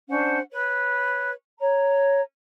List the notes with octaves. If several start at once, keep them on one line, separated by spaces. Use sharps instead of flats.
C#4 D4 C5 F#5
B4 C#5
C#5 A#5